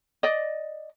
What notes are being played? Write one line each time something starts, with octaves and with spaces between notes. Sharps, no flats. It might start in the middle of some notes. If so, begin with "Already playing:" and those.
D5 D#5